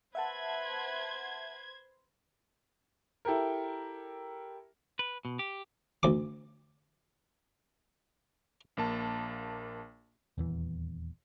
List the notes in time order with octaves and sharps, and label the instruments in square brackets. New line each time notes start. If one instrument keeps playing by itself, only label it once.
[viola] B4 [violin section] C5 G#6 [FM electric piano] E5 F#5 A5
[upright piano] E4 G4 A4 A#4
[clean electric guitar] B4
B2
G4
[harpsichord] D2 D6
[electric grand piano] A#1 A#3 A5
[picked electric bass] D#1 E2 E3